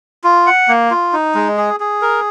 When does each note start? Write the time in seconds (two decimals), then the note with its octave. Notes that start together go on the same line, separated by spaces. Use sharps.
0.24 F4
0.47 F#5
0.68 A#3
0.91 F4
1.13 D#4
1.35 G#3
1.57 G#4
1.80 G#4
2.02 A#4